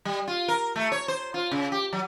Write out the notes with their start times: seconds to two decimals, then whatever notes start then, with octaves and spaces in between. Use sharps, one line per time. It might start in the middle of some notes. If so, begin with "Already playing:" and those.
0.05 G3
0.28 F4
0.48 A#4
0.76 A3
0.92 C#5
1.08 C5
1.34 F4
1.51 C#3
1.72 G4
1.93 F#3